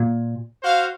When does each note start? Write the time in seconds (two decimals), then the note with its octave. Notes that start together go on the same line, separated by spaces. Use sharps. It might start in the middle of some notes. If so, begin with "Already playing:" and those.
Already playing: A#2
0.63 F#4 C5 F5